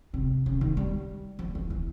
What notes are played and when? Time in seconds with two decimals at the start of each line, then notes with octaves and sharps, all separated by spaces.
0.14 C3
0.46 C#3
0.61 D#3
0.77 G3
1.39 F3
1.55 E3
1.70 E3